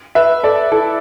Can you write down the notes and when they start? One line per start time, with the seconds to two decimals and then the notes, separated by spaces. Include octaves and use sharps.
0.15 B4 E5
0.43 A4 D5
0.72 E4 A4